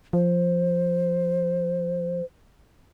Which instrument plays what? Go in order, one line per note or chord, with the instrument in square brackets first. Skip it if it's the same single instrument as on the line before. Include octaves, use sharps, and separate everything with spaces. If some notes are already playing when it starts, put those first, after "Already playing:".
[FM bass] F3 [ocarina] C5